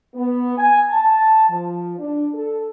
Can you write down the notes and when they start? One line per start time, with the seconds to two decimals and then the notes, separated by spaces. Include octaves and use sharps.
0.15 B3
0.57 G#5
0.90 A5
1.49 F3
1.99 D4
2.34 A4